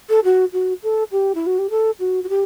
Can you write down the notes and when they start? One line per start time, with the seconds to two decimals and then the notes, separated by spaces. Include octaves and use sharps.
0.09 A4
0.24 F#4
0.53 F#4
0.83 A4
1.12 G4
1.35 E4
1.46 F#4
1.59 G4
1.70 A4
2.00 F#4
2.24 F#4
2.29 G4